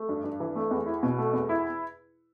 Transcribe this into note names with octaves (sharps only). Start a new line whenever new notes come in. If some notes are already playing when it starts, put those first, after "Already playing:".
Already playing: A3
G2
G2
E3
A3
E2
E4
B2
A3
E2
E4